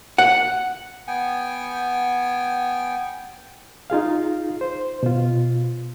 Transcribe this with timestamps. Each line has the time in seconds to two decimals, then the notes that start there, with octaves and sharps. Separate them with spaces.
0.18 F#5
1.08 B3 G5 G#5
3.90 D#4 F4 G#4 F5
4.61 C5
5.03 B2 F4